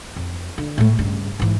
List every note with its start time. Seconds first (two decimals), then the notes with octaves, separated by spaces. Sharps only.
0.16 F2
0.58 D3
0.78 A2 A3
0.99 G2 C#3
1.40 G#2 E3